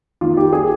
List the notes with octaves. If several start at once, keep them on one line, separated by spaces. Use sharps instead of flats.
D#3 A#3 F4
G4
G#4